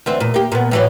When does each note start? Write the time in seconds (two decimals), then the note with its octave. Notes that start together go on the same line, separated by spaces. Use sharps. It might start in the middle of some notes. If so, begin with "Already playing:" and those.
0.06 D2 E3 C4
0.20 E2 A#2
0.34 A#3 G4
0.52 A#2 B3
0.71 A2 E3 F#3